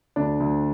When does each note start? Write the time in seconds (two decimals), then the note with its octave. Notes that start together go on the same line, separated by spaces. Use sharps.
0.16 D2 D4
0.40 D2